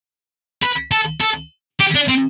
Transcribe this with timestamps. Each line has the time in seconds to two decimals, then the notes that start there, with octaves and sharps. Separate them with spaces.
0.62 B4
0.92 A4
1.21 A4
1.80 G4
1.95 D4
2.08 C4